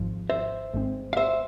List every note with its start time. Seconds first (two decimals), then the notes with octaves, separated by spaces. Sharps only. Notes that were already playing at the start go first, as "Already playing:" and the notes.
Already playing: G#1 G#2 F3
0.30 C5 E5
0.74 G#1 G#2 G#3 C4
1.13 F5
1.17 C5 E5